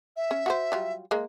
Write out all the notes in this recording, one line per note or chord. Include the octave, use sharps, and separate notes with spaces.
E5
C#4
F#4 G#4 C5
F#3 G3 F4
G#3 A#3